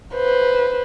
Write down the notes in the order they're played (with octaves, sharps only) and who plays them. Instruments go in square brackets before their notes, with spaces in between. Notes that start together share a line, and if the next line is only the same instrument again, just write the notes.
[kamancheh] B4 C5